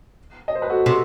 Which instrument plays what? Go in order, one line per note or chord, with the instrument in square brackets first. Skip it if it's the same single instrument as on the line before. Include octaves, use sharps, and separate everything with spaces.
[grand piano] D#5
C5
B4
F#4 A4
[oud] C3